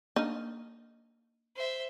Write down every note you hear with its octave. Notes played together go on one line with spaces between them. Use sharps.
A#3 D4 D#4 F6
C5 E5